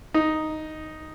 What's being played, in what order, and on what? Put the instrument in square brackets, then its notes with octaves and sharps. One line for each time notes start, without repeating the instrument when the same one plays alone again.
[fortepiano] D#4